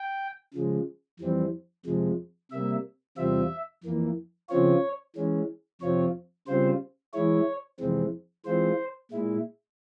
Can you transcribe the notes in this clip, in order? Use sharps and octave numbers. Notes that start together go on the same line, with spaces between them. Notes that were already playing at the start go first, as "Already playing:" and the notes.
Already playing: G5
C#3 F3 G#3
F2 E3 G3 C4
F2 C3 F3 G#3
C3 G3 A#3 E5
E2 C3 G3 C4 F4 E5
F2 E3 A#3
C#3 F3 C4 F4 C#5
E3 G#3 C#4
F2 C3 F3 C4 F4 C#5
C#3 G3 C4 F4 C5
E3 G#3 E4 C#5
F2 C3 E3 G#3 C4
E3 G#3 C4 F4 C5
A#2 G#3 E4